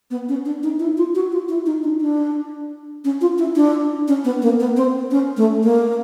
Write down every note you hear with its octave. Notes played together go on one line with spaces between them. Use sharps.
B3
C#4
D4
D#4
E4
F4
F#4
F4
E4
D#4
D4
D4
C#4
F4
E4
D4
C#4
B3
A#3
B3
C4
C#4
A3
A#3